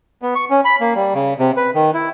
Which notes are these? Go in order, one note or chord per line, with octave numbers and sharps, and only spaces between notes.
B3
C#6
C#4
B5
A#3
G3
C#3
C3
B4
D#3
E4